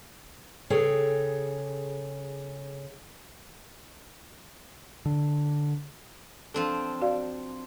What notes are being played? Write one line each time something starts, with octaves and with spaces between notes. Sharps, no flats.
C#3 G#4 A4 C#5 G5
D3
F3 C4 D4 A4
F#4 D5 F5